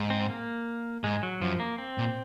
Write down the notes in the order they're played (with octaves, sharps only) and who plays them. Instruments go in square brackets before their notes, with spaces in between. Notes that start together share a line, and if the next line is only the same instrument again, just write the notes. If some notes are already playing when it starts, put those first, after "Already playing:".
Already playing: [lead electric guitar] G#2
[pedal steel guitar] C4
A#3
[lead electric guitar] G#2 [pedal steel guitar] G#3
[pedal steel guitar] F#3
[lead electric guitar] F#2 [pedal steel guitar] F3
[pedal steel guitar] A#3
C4
[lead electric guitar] A#2